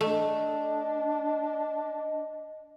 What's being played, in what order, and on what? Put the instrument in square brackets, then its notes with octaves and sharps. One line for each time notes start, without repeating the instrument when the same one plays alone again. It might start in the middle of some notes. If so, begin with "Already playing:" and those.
[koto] A3 [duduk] D4 [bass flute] D#5